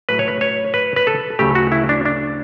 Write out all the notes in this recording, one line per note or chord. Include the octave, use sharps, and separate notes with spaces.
A2 F#3 A3 B4
C#5
B4
C#5
B4
B4
A4
D2 C#3 F#3 A3 G4
F#4
E4
D4
D4